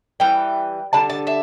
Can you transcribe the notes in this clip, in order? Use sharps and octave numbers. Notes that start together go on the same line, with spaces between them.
E3 G3 G5
D3 G3 D4 A5
A5
E5 A5